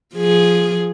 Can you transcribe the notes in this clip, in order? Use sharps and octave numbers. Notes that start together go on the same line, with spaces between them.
F3 G#4